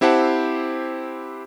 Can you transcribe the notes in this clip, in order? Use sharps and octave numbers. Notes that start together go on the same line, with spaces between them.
C4 E4 G4 C5 F#5 A5